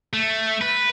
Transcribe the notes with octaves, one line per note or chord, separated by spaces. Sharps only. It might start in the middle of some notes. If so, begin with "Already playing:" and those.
A3
B4